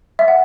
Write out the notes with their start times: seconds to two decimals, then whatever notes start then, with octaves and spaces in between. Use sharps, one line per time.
0.19 E5
0.28 F#5